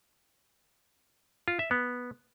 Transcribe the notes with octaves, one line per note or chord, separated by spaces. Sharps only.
F4
E5
B3